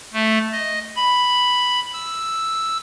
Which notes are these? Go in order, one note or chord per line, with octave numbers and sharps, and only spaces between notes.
A3
D#5
B5
E6